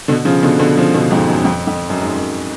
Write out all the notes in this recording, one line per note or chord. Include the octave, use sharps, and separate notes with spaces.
B2 D3
C#3 F3
B2 D3
B2 D3
C#3 F3
B2 D3
F2 G#2
F#2
F2
F2
F#2
G#2
F#2